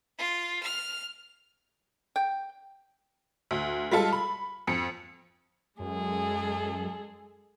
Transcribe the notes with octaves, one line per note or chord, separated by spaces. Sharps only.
F4
F6
G5
D2
G3 G#3 F4 A4
B5
F2 C#7
F#2 G#3 G#4 A4